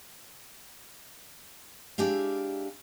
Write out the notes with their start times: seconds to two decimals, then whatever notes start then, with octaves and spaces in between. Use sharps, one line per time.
1.98 G#3 D4 E4 G4 E5 F5